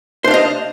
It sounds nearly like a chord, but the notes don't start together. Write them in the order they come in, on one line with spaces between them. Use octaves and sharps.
C5 D4 F5 D#5